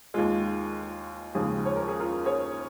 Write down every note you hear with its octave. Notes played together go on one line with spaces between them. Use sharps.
D#2 D#3 G#3 F4
D#2 C#3 F3 G#3 G#4
C#5
A#4
G#4
F4 A#4
G#4 C#5